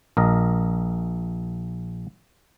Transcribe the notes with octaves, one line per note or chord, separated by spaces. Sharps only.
A#1 A#4 D#5